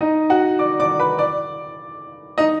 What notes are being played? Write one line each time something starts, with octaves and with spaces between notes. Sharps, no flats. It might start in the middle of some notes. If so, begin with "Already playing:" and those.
D#4 D#5
F#4 F#5
D5 D6
D5 D6
B4 B5
D5 D6
D#4 D#5